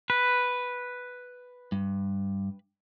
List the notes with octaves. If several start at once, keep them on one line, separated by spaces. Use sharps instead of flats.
B4
G2